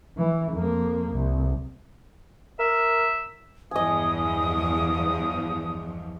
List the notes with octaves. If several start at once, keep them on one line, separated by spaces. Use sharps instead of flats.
E3
F2 A#3
C2
A#4 E5
E2 G2 F3 D#5 G#5 D#6